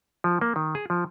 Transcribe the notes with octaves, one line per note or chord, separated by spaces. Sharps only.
F3
A#3
D#3
G#4
F3